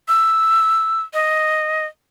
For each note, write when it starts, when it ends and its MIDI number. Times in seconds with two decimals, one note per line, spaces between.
0.08 1.02 88
1.14 1.85 75